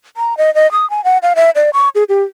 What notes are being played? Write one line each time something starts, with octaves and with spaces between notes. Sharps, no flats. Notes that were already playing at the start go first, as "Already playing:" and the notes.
A#5
D#5
D#5
D#6
G#5
F#5
F5
E5
D5
C#6
G#4
G4